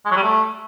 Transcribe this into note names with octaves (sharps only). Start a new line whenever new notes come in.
G#3
F#3
G3
A3